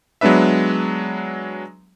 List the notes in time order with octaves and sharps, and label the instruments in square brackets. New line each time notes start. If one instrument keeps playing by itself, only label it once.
[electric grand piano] F#3 G#3 B3 D4 B4 E5